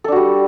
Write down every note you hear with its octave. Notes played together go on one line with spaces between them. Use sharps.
G3 D4 F#4 A4